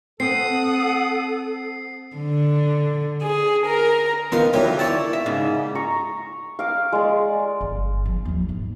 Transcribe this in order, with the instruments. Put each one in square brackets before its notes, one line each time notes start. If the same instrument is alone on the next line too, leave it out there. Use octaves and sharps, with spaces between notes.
[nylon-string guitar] C4 [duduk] A4 [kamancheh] F#5 D#6 [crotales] C7
[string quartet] D3
G#4
A#4
[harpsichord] D#3 C6 [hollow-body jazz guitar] B3 F4 A#4
[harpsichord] D3 E3 F#3 [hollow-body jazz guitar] G4 A#4
[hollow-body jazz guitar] E4 C#5 [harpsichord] D5 A5
[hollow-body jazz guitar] E5
G#2 C#3
[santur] A#5 C#6
F5 D6
G#3 D5
[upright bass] G1
F3
D#2 F#3
G#2